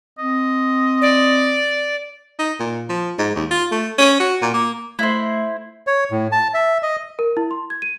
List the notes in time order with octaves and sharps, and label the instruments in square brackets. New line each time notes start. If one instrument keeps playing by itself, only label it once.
[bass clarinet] C4 [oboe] D#5
[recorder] D5
[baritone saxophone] D#4
A#2
F3
G#2
D#2
F4
A3
C#4
F#4
A#2
A#3
[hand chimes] A3 E5 C7 [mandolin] E4 C5
[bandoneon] C#5
A2
A5
E5
D#5
[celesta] A#4
E4
C6
G#6
D#7